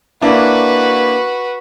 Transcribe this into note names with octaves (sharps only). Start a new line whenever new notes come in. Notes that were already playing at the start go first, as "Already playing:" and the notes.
A#3 D4 E4 F#4 B4